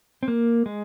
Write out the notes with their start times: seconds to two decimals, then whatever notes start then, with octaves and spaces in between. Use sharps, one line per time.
0.23 C4
0.28 A#3
0.66 G#3